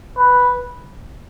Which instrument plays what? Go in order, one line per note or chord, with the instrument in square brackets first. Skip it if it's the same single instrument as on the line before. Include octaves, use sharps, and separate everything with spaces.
[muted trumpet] B4